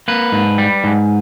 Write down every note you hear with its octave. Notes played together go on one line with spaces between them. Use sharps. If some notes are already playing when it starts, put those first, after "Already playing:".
A#3 B4
G#2
G3
G#2